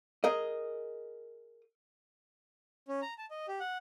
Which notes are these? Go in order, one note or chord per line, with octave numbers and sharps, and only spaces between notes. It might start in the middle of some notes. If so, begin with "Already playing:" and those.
G#4 A#4 D#5
C#4
A#5
A5
D#5
G4
F#5